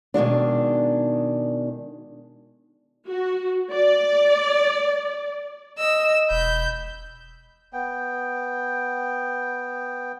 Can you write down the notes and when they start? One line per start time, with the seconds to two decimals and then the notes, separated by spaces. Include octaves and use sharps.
0.14 B2 D#3 G#3 D4
3.07 F#4
3.71 D5
5.79 D#5 E6
6.31 E1 B5 G6
7.73 B3 G5